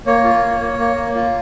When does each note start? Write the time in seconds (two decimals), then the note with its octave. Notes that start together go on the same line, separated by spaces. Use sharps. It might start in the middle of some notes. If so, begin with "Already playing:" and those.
0.06 A#3 C#5
0.24 F4
0.43 A#3
0.60 A#3
0.79 A#3
0.96 A#3
1.15 F4